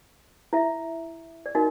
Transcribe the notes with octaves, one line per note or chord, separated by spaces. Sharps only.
E4 E5
D5
D#4 F#4 A#4 D#5